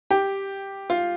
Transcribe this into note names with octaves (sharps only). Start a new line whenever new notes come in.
G4
F4